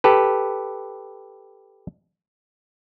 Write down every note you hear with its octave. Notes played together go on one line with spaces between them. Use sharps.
G4 A4 B4